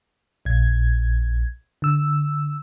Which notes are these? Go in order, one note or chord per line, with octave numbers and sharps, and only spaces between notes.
A#1 G#6
D3 E6